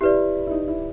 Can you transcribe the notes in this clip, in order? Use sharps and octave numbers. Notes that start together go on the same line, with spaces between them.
E4 G4 B4 D5
E4
D#4
E4